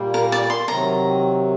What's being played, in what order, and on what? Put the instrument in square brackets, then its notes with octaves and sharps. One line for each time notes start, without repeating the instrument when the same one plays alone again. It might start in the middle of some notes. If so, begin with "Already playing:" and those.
Already playing: [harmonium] A#2 G3 A#3
[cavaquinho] A#4
D5
C6
[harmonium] C3 D#3 F#3 [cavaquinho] A#5